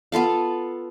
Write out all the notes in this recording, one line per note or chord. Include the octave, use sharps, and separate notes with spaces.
B3 F4 A4 F5